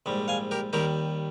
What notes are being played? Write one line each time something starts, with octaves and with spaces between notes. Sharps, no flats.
A#1 G#2 G3
F5 G#5
G4 A#4
D#2 D#3 G3 G4 A#4